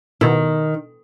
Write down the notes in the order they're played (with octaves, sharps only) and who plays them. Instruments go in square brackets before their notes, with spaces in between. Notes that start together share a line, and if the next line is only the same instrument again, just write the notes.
[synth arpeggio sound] B2 E4 [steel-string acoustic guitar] D#3